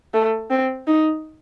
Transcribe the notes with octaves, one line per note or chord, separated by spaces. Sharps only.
A3
C4
D#4